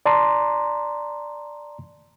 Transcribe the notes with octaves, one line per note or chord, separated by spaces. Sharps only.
D5 A5 A#5 C6